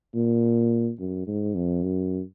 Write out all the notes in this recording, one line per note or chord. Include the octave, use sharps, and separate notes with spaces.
A#2
F#2
G#2
F2
F#2